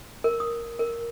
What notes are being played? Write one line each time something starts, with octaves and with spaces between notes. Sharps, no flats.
A#4
D#6
A#4